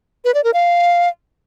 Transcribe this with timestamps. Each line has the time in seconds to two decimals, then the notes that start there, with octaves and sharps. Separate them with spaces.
0.25 B4
0.34 D5
0.44 A#4
0.54 F5